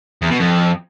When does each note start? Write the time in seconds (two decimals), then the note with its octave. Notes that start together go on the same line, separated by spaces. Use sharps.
0.22 E2
0.31 B2
0.39 F2